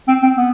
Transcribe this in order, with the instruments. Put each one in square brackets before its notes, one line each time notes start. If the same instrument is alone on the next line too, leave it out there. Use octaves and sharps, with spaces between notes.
[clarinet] C4
C4
B3